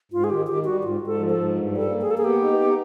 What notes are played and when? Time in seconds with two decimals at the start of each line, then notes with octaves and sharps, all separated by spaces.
0.12 G#2 F4
0.24 G#4
0.30 D#3 G4
0.47 D#3 G4
0.65 G3 F#4
0.83 G#2 F4
1.00 G#2
1.06 A4
1.18 F3
1.30 A4
1.36 G#2
1.54 G2
1.71 G3
1.77 A4
1.89 A#3
2.01 G#4
2.07 A#3 A4
2.18 G#4
2.24 B3 G4
2.42 D#4
2.60 B3